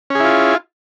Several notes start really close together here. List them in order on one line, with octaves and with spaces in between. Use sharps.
C#4 G#4 E4 F4